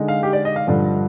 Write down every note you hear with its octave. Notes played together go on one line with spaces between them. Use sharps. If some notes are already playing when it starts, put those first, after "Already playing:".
Already playing: D3 G#3 D#4
F5
G4
D5
D#5
F5
G2 D3 F3